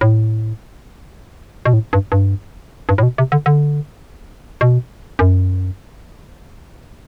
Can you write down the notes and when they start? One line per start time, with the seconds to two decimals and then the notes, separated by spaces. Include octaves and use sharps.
0.01 A2
1.65 B2
1.73 A2
1.93 G2
2.12 G2
2.89 G2
2.98 A2
3.03 B2
3.18 C3
3.32 D3
3.46 D3
4.61 B2
5.19 F#2